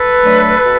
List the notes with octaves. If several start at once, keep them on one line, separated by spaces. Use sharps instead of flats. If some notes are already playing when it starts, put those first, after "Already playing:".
Already playing: A4 B4
F#3 A3 D4
B2